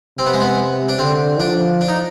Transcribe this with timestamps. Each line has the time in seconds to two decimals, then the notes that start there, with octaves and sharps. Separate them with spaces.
0.18 C3 C4
0.26 B3
0.33 G#3
0.40 B3
0.88 D4
0.99 D3 C4
1.40 F3 D4
1.81 D4
1.88 D#4